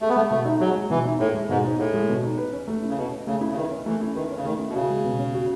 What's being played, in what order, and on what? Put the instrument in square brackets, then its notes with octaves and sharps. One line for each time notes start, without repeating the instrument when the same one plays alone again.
[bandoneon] A3 [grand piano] G#4
[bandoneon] B3
[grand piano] G#3 [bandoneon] A3
[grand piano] B2 [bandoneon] A3
[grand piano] D#4
[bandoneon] F#3 [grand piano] G#4
[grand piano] G#3
[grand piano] B2 [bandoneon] E3
[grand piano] D#4
[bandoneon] A2 [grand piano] G#4
[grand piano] G#3
[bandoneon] G#2 [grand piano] B2
[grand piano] D#4
[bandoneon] A2 [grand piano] G#4
[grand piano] G#3
B2
D#4
B4
C#4
A3
E4
[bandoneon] C#3
[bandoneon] B2 [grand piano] B4
[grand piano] C#4
[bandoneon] C#3 [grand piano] A3
[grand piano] E4
[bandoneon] C#3
[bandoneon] D#3 [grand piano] B4
[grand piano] C#4
[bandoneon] E3 [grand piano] A3
[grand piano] E4
[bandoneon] D#3 [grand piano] B4
[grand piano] C#4
[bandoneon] C#3
[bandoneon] D#3 [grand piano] A3
[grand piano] E4
[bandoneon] B2
[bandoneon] C#3 [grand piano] F#4
[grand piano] G#3
B2
C#4
F#4